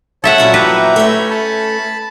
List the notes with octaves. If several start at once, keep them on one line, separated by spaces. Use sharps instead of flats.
A4 C#5 E5 F#5 A5
A#2 F#3 C#4 E4
G4 B4 E5 A#5
A3 C#4
A5 B5